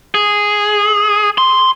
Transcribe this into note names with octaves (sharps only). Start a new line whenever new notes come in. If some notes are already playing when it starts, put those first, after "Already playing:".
G#4
C6